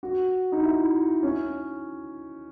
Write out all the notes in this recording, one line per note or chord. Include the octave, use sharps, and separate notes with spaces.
F#4
D#4
E4
C#4